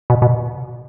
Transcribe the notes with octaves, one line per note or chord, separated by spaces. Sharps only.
B2
B2